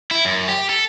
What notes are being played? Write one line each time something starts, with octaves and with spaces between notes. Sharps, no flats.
E4
F#2
G4
A4